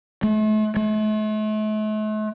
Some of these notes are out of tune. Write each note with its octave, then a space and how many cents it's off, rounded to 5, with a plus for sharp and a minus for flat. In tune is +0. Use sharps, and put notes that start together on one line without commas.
A3 -40
A3 -45